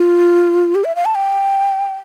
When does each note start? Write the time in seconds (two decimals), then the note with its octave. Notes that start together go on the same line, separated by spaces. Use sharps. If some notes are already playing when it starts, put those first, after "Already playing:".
Already playing: F4
0.75 G4
0.84 E5
0.96 F5
1.05 A5
1.15 G5